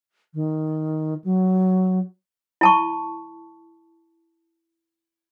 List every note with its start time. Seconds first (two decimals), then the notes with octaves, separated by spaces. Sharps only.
0.34 D#3
1.24 F#3
2.61 E4 A5 C#6